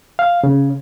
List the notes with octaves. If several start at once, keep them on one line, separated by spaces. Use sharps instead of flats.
F5
C#3